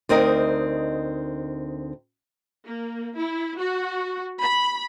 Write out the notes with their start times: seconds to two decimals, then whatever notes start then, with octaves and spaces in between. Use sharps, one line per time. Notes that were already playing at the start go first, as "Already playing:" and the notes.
0.09 D2 C4 D#4 A#4 D#5
2.67 A#3
3.16 E4
3.59 F#4
4.42 B5